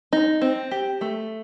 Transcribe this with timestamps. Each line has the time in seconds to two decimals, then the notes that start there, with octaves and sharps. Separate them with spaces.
0.13 D#4
0.42 C4
0.71 G4
1.01 A3